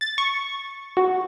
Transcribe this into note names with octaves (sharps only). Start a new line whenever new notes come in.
A6
C#6
F#4